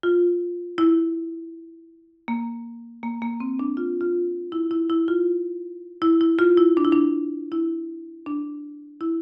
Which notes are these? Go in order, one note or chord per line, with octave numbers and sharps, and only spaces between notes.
F4
E4
A#3
A#3
A#3
C4
D4
F4
F4
E4
E4
E4
F4
E4
E4
F4
E4
D4
E4
D4
E4
D4
E4